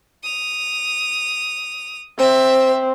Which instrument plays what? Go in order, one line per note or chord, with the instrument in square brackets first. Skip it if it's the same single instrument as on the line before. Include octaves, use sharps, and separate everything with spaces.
[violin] D#6 F7
[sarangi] C4 [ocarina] C5 [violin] E5